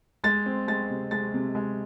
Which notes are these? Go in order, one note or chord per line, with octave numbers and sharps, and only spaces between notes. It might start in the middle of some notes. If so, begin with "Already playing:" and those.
G#3 A6
C4
G#3 A6
C3
G#3 A6
C3
G#3